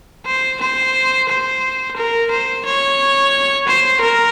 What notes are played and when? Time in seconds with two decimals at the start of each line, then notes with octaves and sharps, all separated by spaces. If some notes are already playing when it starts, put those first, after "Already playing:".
0.26 C5
0.61 C5
1.29 C5
1.97 A#4
2.31 C5
2.66 C#5
3.68 C5
4.01 A#4